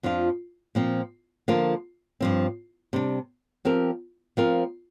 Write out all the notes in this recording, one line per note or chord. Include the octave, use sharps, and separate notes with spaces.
F2 F3 D4 F4
A#2 F3 C4
D3 F3 A#3 F4 A#4
G2 F3 C4
C3 G3 D4
F3 C4 G4 A#4
F3 C4 F4 A#4